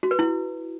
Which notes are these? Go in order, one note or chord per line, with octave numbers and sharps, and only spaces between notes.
F#4
B4
E4